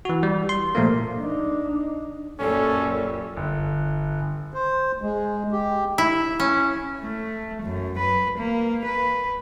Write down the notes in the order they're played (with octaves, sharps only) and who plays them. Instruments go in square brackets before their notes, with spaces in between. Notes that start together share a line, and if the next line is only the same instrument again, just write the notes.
[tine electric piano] E3 F#4
G3
C6
A#2 F3 A3 A#3
[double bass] D4 D#4
[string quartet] F#2 A#2 G3 [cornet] C#4 [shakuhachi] A4
[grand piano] G1
[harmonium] C5
G#3
G4
[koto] E4
C#4
[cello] A3
F#2
B4
A#3
B4